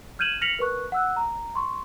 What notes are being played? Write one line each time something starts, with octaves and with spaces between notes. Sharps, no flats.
F6 G6 G#6 D#7 E7 F#7
F6 A#6 B6 C#7 F7 F#7
A#4 B4 C#6 F#6
F#5 E6 F#6
A#5
C6 C#6